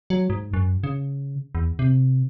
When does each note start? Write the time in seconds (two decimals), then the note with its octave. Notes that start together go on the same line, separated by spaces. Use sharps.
0.10 F#3
0.30 G#2
0.53 F#2
0.84 C#3
1.55 E2
1.79 C3